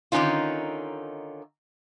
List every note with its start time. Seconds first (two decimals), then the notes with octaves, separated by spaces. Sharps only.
0.12 D3 D#3 B3 C#4 D#4 F4